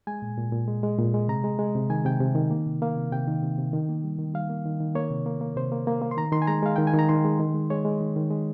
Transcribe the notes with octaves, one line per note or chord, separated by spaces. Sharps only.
G#3 G#5
A#2
A#2
A#2
G#3
G#3
A#2
G#3
C3 A#5
G#3
G#3
C3
D#3 G#5
C3 G5
C3
D#3
A#3
C3
A#3 F5
C3
C3 G5
D#3
C3
C3
D#3
A#3
G3
D#3
G3 F5
A#3
D#3
D#3
A#3 C#5
C3
A#3
A#3
C3 C5
A#3
A#3
A#3
C6
D#3 A#5
D#3 C6
G#5
G#3 A#5
G#3 F5
D#3 G5
G#5
D#3 A#5
D#3 C6
G#3
D#3
G#3
G#3 C#5
G#3
D#3
D#3
G#3